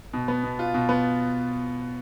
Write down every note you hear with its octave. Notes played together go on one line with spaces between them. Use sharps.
B2
B3
B2
F4
B2
B3